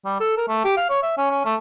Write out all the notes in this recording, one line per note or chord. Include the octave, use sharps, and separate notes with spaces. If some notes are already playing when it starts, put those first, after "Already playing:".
G3
A4
A#4
A3
G4
F5
C#5
E5
C#4
C#4
A3